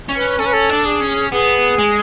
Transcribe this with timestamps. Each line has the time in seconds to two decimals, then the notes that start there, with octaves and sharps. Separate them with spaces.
0.09 C#4
0.16 B4
0.39 C#4 A4
0.46 B4
0.53 A4
0.69 D4
0.85 G#4
1.00 C#4
1.32 B3 G#4
1.79 G#3